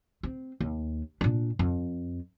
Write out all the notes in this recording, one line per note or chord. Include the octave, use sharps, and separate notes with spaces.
C4
D#2
A#2 D4
F2